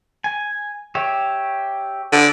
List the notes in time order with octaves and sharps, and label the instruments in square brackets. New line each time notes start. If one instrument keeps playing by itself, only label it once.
[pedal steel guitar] G#5
G4 C#5 E5
[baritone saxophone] D3